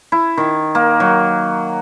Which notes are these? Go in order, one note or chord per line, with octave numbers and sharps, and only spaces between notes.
E4
D#3
A#3
F#3